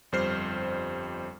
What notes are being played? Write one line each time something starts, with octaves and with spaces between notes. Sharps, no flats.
G1 F2 G3 C5 F6 C7